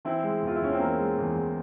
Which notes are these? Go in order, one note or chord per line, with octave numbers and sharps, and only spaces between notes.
E3 C4 E4
G#3
E2 F4
E4
E2 C#4
C4
E3 A#3
G#3
E2
E2